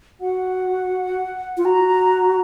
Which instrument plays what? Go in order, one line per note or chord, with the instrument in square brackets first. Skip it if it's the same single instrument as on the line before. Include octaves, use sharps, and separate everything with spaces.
[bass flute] F#4 [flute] F#5
[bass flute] F4
[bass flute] F#4 [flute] A#5